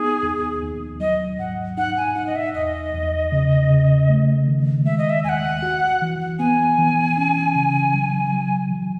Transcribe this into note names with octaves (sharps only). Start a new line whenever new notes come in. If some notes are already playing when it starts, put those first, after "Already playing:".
Already playing: B3 D#4 G#4
D#2
D#2
F#3 D#5
G#2 F#5
D#4 F#5
G#5
D#4 F#5
D#5
E5
E2 D#5
E2
C#3
C#3
A3
D#3
G#3 E5
D#5
E5
D#2 F#5 G#5
F#4
E3
B3 G#5
E3
C#4
C#3
F#3
F#3
E3